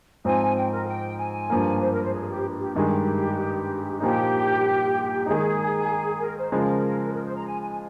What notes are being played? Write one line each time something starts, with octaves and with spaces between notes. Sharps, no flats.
G#2 F3 C4 G#5
G5
A#4
G5
G#5
G2 F3 A#3
C5
A#4
C5
G#4
G4
G4
G2 D#3 G#3 G4
A#2 F3 A#3 D#4 G4
D#3 G#3 D#4 G#4
A#4
C5
C#3 F3 G#3 A#4
A#4
C5
A#5
G#5
G#5